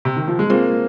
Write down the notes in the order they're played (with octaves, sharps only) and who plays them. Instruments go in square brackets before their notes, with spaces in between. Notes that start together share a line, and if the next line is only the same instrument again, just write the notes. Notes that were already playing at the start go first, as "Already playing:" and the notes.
[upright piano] C3
D#3
F3
G#3
[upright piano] A#3 [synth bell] C4 F4 G#4 C5